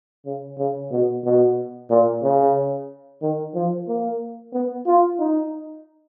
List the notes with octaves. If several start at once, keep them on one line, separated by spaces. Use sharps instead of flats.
C#3
C#3
B2
B2
A#2
C#3
D#3
F3
A#3
B3
F4
D#4